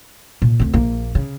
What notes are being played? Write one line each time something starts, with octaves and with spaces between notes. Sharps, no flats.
A#2
D2 C4
A#1 A#3
C#3